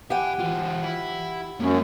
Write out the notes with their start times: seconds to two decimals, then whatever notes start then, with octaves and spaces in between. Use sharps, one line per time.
0.10 G4 E5 F#5 G#5
0.40 E3 F4
0.83 E4
1.60 F#2 A#3 C4